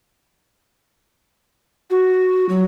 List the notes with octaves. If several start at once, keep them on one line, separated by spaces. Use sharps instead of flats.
F#4
F#3